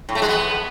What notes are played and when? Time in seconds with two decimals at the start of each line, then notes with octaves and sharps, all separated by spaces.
0.09 A2
0.15 A3
0.22 G#3
0.28 B3